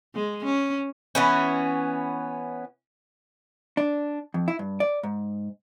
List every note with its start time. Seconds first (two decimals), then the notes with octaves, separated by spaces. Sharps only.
0.15 G#3
0.44 C#4
1.15 E3 B3 C#4
3.77 D4
4.34 F2
4.48 E4
4.59 G2
4.80 D5
5.03 G#2